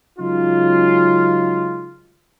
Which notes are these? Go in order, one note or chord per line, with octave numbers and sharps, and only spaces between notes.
C#3 F#3 G#3 C#4 D#4 F4